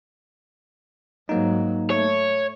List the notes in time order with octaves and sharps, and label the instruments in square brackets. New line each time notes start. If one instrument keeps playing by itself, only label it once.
[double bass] G#2 F#3 [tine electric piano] A#3 D#4
[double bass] A3 [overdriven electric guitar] C#5